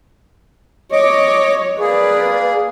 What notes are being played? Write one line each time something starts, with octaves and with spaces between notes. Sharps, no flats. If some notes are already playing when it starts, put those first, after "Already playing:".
C#5 D#5 D6
A#3 G#4 B4 D5